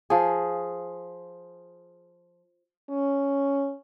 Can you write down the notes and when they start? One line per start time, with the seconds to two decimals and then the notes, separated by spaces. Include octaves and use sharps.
0.10 F3 G#4
2.90 C#4